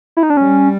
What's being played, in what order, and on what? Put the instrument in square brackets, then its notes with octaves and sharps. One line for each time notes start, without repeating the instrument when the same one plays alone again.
[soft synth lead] E4
D#4
D4
[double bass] G3 [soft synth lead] C#4